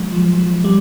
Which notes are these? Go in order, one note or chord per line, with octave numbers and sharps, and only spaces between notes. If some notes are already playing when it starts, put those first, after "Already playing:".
Already playing: F#3 G#3
F3
F3
G3